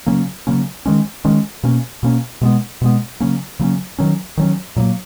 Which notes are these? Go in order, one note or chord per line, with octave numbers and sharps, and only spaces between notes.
C#3 F#3 A#3 C#4
C#3 F#3 A#3 C#4
D#3 G#3 C#4
D#3 G#3 C#4
B2 A#3 C#4
B2 A#3 C#4
B2 G#3 B3
B2 G#3 B3
C#3 F#3 A#3 C#4
C#3 F#3 A#3 C#4
D#3 F#3 C#4
D#3 F#3 C#4
A#2 F#3 A#3